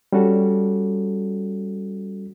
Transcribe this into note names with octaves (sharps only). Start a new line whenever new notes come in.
G3 C#4 F#4 A4